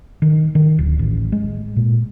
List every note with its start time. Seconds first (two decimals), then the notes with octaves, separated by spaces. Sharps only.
0.22 D#3
0.55 D#3
0.79 D1
0.99 A1
1.32 G#3
1.76 A#2